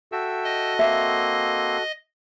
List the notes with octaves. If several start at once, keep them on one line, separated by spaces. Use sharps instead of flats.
F#4 A4 E5 G5 E6
D#5
A#3 C4 E5 C6